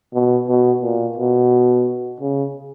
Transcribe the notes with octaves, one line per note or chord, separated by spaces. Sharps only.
B2
B2
A#2
B2
C#3